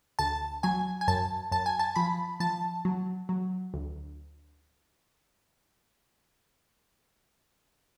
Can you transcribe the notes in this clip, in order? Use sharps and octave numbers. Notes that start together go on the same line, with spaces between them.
D2 A5
F#3 G#5
G#5
F#2 A5
F#2 A5
G#5
A5
F3 B5
F3 A5
F#3
F#3
D2